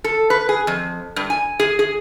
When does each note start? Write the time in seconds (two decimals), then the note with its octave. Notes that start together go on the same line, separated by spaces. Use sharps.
0.04 A4
0.30 B4
0.49 G#4
0.67 F2
1.16 G2
1.30 G#5
1.60 G#4
1.79 G#4